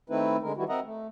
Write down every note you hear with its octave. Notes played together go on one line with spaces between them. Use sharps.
D#3 A3 C4 D#4 E4 B4
D3 G#3 A#4
D#3 E3 G3 E4 F#4
C4 A#4 D#5 E5 F#5 A#5
A3